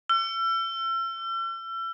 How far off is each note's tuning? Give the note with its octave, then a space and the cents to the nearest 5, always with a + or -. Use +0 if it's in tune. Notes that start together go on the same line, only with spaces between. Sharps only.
E6 +40